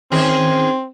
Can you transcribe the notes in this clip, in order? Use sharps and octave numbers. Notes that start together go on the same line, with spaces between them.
D#3 C4 C#4 G#4